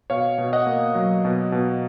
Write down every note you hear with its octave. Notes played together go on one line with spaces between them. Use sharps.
B2 C#5 F5
B2
D#5 F#5
A#3
F#3
B2
B2